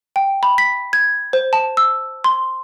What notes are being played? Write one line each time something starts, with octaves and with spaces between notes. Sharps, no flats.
G5
B5
B6
G#6
C5
A5
E6
C6